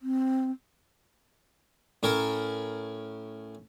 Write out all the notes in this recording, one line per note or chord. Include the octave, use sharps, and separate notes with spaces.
C4
A2 C#4 A#4